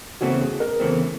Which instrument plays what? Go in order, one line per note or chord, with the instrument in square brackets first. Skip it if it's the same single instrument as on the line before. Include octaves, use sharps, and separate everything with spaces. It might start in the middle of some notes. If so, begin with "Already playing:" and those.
[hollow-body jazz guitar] E2 C#3 E3 A3 C4 [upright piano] F#4
[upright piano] G#4
A#4
[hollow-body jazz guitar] E2 C#3 E3 A3 C4